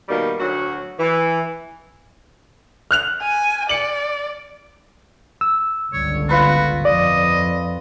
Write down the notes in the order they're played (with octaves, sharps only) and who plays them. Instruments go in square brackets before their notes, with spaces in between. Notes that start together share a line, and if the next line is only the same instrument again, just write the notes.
[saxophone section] B2 D#3 G3 A#3
D2 F#3 F#4
E3
[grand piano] F6 F#6 F7
[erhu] G#5
[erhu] D5 [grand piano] C#7 F#7
[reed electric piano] E6
[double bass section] G1 C#2 D3 [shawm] C#5
[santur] F4 B4 C#6 [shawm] F#4
[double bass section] F2 [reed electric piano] D5 [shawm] D#5